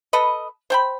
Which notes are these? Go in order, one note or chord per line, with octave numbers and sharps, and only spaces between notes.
A4 B4 D#5
C5 G5 B5